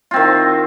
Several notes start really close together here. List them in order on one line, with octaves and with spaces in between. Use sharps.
F4 C4 D#3